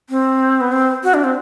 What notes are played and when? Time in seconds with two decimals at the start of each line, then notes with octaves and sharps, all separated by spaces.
0.10 C4
0.61 B3
0.72 C4
1.03 F#4
1.14 D4
1.24 C4